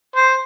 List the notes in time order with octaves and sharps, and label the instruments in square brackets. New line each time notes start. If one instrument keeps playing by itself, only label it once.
[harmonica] C5